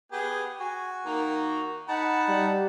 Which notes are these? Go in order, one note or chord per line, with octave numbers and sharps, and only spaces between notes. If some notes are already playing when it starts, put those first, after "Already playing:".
B3 G4 G#4
F#4 G#5
D#3 A#3 A#4
D#4 F#5 A5 B5
G3